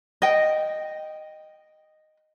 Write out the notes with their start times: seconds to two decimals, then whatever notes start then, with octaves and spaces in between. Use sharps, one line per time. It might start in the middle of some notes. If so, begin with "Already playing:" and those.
0.22 D#5 G5